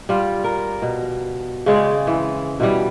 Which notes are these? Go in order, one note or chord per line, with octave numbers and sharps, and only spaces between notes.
G3 F4
A#4
B2
C#3 G#3 C4 D5
E3
B2 E3 G3